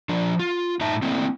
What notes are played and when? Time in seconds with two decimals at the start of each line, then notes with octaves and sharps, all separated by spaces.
0.09 F3 D4
0.39 F4
0.81 A2 D#4 E5 A5
1.02 A3 A#3 C4 E4